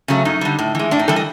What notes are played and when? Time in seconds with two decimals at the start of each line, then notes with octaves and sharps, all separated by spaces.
0.08 C#3 F#3 A3
0.25 F#2 D#4
0.41 D3 G3
0.59 A2
0.75 E3 G#3
0.91 A2 D4
0.99 D#4
1.08 E3 G3 A4
1.16 D#5